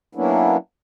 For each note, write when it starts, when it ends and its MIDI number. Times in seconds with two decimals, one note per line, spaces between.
0.15 0.57 54
0.15 0.57 58
0.15 0.57 59
0.15 0.57 61
0.15 0.57 62
0.15 0.57 64